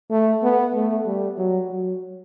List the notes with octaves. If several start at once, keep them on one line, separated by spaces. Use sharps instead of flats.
A3
B3
A3
G3
F#3
F#3